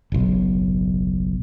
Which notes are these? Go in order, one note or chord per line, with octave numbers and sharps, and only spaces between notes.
F#1 B1